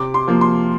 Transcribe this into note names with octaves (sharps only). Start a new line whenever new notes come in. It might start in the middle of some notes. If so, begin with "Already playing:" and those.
Already playing: C3 D6
C6
F3 A#3
C6